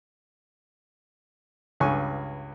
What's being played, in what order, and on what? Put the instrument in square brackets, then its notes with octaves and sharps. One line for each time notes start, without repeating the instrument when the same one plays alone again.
[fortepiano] C#2 G2 G#5 C#6